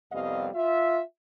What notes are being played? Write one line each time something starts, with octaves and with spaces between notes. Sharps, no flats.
C2 F2 G3 B3 D#5 F5
F4 E5